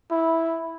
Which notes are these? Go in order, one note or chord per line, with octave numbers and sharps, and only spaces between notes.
E4